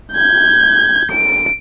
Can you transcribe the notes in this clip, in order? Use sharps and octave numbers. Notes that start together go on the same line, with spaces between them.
G6 G#6
D7